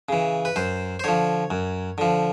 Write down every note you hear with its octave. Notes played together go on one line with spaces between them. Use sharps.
C#3 E3
B4
F#2 C5
C5
D3 F3 C#5
F#2
D3 F3